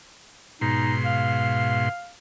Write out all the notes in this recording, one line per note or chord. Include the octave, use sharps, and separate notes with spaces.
G#2 B2 D#4 C6
F5